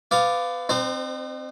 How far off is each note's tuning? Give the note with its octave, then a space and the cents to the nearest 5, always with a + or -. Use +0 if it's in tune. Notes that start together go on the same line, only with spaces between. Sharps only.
B3 +30 F5 +0 D6 +5
C4 +0 D#4 -45 C5 -30